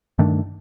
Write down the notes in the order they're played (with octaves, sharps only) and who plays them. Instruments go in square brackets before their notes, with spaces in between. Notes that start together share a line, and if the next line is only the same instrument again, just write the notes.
[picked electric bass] G2 D#3 A3 D4